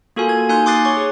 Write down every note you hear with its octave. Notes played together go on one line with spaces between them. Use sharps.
A#3 F4 F#4 A4 A#4 G#5
G#6
A#3 D#4 G#5 C6 F#6 G6
C6 D6 D#6 F#6 A6 C7
C#5 C#6
G#4